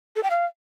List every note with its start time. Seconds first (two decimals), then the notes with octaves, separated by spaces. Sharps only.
0.16 A4
0.23 G5
0.30 F5